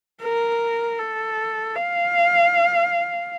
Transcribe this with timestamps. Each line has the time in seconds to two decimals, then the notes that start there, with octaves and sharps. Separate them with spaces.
0.22 A#4
0.99 A4
1.75 F5